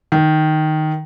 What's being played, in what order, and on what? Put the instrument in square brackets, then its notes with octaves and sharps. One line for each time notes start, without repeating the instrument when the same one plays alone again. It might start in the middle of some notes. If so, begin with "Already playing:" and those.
[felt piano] D#3